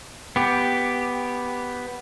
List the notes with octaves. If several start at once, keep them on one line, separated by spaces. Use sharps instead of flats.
B3 G4